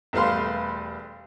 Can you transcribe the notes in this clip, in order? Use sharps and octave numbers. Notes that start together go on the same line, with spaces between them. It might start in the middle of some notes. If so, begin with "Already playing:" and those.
E1 G3 A3 B4 F5 C6